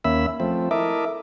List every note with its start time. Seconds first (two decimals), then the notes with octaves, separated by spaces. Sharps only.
0.04 D#2 A#3 C#4 E5 B5 E6
0.40 F3 A3 C4
0.71 E4 A4 A#4 D#5 E5 D6